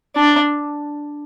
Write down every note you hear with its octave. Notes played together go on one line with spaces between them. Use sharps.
D4